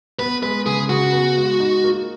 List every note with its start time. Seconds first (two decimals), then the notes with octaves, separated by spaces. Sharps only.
0.19 B3 B4
0.43 G#3 B4
0.66 C#3 G#4
0.89 C#3 F#4
1.13 B3
1.37 G#3
1.60 D#4
1.84 A#3